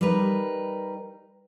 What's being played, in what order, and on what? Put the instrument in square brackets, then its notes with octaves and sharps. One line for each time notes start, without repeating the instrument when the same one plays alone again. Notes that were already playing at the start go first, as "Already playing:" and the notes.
[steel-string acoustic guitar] G3 D#4 A#4 B4